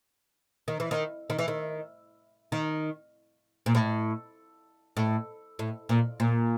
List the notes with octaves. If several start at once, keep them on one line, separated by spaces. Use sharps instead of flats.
D#3
E3
D#3
D#3
E3
D#3
D#3
A#2
A2
A2
A2
A#2
A#2